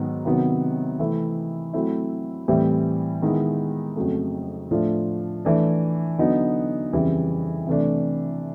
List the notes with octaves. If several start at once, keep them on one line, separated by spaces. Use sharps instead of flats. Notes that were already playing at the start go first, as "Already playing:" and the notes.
Already playing: G#2 D#3 F#3 B3
C3 D#3 F#3 B3
C3 E3 A3 C4 E4
F#3 A3 C4 E4
A2 E3 G3 C4
D#3 G#3 B3 E4
F2 C#3 F#3 A3
A2 F3 A3 D4 F4
E3 A3 D4
D3 F#3 B3 D#4
F2 C#3 E3 G3
C3 E3 A3 D4